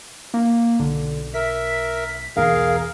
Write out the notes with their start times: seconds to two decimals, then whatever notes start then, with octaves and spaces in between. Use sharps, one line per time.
0.34 A#3
0.79 B1 D3
1.34 A#4 E5 B6
2.37 B1 E2 G#4 A#4 F5